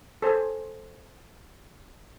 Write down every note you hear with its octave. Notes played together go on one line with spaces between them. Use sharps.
A4 C5 G#5